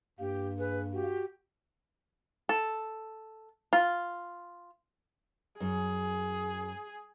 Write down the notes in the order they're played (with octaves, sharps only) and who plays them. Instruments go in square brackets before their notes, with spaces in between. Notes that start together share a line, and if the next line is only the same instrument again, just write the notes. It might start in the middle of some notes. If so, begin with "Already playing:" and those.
[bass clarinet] G2 [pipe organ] A#3 [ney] G4
[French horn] G#4 [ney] B4
[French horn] F#4 [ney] G4
[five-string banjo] A4
F4
[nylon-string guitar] F#2 [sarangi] G#4